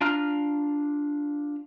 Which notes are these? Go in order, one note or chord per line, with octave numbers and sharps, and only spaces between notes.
D4 F4 A#5 F6